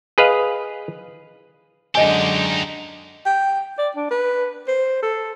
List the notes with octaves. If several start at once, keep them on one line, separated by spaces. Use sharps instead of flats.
G#4 B4 D#5 F5
F#2 D3 G#3 D#4 G4 D#5 G#5
G5
D5
D4
B4
C5
A4